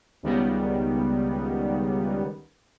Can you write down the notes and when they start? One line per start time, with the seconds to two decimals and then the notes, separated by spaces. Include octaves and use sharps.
0.23 C#2 D#3 G3 B3